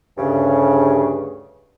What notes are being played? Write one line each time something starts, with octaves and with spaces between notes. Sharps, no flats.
D2 G2 C#3